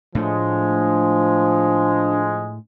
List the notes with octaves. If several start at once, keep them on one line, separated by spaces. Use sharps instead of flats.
A2 F3 G#3 A3 D4